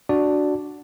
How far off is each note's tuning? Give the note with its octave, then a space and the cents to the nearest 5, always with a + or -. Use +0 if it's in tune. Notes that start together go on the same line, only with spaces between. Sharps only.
D4 +0 F#4 +0 D5 +0